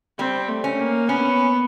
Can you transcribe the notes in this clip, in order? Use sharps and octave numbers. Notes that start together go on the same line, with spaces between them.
G3 C4
A3
C#4
A#3
B3 C#4